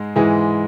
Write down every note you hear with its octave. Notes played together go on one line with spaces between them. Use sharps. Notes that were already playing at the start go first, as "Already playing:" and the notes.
Already playing: G#2 G#3
G#2 E3 G#3